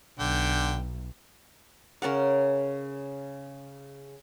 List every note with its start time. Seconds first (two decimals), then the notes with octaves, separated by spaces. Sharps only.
0.19 B1 D3 G5
2.02 C#3 C#4 A#4 F#5